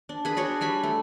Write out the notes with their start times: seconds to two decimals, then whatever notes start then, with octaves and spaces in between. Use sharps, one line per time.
0.09 D4
0.25 G#4 B4
0.37 D4 F#4 C#5
0.61 G3 G#5 B5
0.83 A3